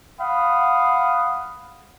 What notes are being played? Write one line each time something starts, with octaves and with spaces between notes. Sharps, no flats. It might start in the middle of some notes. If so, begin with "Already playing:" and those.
F5 F#5 B5 D#6